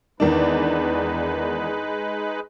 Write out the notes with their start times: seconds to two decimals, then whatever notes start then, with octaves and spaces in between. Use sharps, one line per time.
0.20 E2 D#3 G#3 D4 D#4 B4